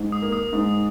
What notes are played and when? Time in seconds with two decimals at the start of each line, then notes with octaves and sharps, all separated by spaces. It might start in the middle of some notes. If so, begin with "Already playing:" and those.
Already playing: G#2
0.12 D#6
0.22 A#3
0.32 D#6
0.53 G#2